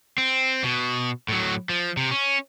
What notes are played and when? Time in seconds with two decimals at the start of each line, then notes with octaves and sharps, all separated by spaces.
0.18 C4
0.64 B2
1.29 A2 F#3
1.69 F3
1.97 C3
2.11 C#4